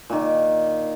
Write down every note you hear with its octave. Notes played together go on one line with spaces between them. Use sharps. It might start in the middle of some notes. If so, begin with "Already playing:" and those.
A#2 D#3